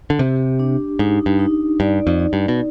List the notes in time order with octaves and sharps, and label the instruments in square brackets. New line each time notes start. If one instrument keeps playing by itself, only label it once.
[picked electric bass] D3
[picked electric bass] C3 [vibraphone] G4
[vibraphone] D4
[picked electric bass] G#2 [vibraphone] D#4
[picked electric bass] G2
[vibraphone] D#4
[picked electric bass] G2 [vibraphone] D5
[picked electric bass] F2
[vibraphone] D5
[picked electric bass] G2
B2